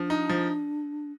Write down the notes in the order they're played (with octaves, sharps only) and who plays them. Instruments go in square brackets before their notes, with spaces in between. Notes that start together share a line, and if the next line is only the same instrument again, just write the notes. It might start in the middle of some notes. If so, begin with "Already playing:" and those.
Already playing: [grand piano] F3 [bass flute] D4
[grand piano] D#4
F3